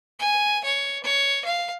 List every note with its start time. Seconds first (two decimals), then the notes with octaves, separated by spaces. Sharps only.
0.19 G#5
0.64 C#5
1.04 C#5
1.45 F5